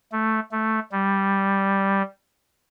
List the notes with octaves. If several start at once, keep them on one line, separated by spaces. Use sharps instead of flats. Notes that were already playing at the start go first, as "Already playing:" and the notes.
A3
A3
G3